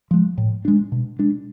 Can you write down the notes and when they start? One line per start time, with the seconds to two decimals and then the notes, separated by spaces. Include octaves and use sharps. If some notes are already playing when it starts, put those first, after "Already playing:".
0.11 F3 G#3
0.38 A2
0.65 G#3 D4
0.92 B2
1.19 G#3 D4